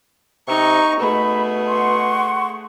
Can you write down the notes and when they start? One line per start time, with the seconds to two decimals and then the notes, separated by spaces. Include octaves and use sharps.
0.48 C3 D#4 A#5 C#6
1.00 B2 A3 G#4 B5
1.67 F#5 C6 C#6